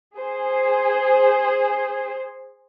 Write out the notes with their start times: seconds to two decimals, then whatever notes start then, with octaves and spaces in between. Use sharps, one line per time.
0.18 G#4 C5